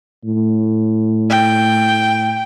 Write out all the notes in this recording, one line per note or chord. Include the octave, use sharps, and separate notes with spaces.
A2
G5